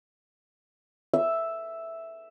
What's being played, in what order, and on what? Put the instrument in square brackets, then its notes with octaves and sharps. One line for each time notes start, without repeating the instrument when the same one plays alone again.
[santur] E5